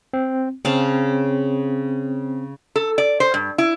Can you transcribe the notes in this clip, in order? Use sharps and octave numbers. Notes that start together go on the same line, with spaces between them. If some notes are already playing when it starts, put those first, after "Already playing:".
C4
C#3 C4 F5 A5
A4
D5
C5
G2
E4